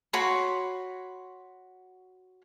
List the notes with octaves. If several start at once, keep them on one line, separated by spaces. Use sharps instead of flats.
F#4 C#5 B5 C6